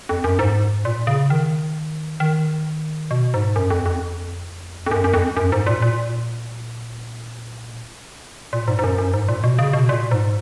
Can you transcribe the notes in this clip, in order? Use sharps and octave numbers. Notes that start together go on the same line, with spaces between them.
F2
F#2
G#2
A#2
C#3
D#3
D#3
B2
G#2
F#2
F2
F2
F2
F#2
F#2
F2
F#2
G#2
A#2
A#2
A#2
G#2
G#2
F#2
F#2
G#2
A#2
B2
C#3
B2
A#2
G#2